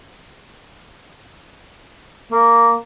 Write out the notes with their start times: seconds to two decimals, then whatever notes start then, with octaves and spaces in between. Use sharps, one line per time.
2.32 A#3